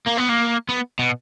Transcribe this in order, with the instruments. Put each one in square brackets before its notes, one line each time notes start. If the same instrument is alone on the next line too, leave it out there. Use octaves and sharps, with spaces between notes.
[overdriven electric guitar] A#3
B3
A#3
B3
B2